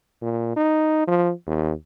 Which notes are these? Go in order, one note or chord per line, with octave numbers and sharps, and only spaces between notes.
A#2
D#4
F3
D#2